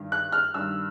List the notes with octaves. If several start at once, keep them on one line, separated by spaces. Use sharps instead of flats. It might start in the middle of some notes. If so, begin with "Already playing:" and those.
Already playing: G2 D#3
F#6
F6
G2 D#3 E6